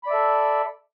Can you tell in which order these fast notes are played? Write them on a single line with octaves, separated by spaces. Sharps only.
B5 D5 E5 A4